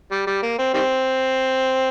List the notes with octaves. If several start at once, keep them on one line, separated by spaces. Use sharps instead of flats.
G3
G3
A#3
C4
D#3 G3 C4